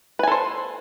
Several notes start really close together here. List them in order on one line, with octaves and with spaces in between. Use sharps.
B4 G#5 A4 C5